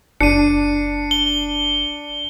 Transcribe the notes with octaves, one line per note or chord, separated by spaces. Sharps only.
F#1 D4 C#7 D#7
G7